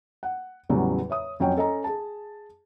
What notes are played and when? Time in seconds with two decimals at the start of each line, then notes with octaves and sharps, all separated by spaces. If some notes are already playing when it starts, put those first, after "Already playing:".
0.23 F#5
0.69 E2 A2 C#3 F#3 G3
1.10 C#5 E5 D#6
1.40 F2 F#3 C#4 C#5 G5
1.56 C#4 A4 D#5 A#5
1.84 G#4 A5